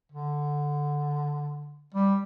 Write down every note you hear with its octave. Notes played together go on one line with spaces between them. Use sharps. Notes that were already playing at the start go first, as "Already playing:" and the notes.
D3
G3